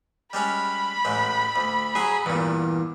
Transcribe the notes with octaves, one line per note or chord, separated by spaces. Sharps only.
G3 G#3 C#4 B5
A1 A2 G#3
D2
F#3 F#4 G#4
E2 G2 A#2